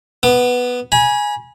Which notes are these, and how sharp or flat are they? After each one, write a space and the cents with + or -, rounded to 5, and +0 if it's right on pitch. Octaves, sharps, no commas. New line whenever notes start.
B3 +0 D6 +40
G#5 +0 B5 -40